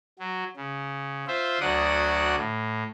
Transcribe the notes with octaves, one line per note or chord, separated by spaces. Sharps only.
F#3
C#3
F4 C5 E5
D2 F#3 D5 F#5 D#6
A2